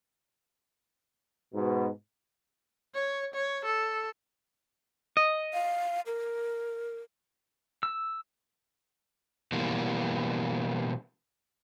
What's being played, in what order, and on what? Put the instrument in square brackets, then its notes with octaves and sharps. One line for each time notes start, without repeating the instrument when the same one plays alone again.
[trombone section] G#2 B2
[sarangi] C#5
C#5
A4
[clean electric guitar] D#5
[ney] F5
A#4
[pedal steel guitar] E6
[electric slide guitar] B2 E3 G3 A#3